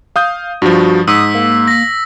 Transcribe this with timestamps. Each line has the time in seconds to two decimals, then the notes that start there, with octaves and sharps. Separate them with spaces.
0.16 F5 D#6 G6
0.62 G2 F3 F#4
1.08 G#2 D#6 E6 B6
1.34 A#3
1.68 A#6 B6